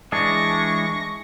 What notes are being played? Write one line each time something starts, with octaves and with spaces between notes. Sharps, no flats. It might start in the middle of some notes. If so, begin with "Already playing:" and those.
E3 G#3 D4 C#6 A#6